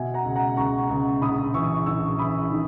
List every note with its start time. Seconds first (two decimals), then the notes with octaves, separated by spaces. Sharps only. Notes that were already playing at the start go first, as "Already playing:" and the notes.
Already playing: B2 E5 G#5
0.14 F#5 A#5
0.25 C#2
0.36 F#5 A#5
0.57 C#2 A#5 C#6
0.89 C#2
1.21 A#1 B5 D#6
1.54 E3 C#6 E6
1.86 A#1 C#6 E6
2.19 E3 B5 D#6
2.52 D#3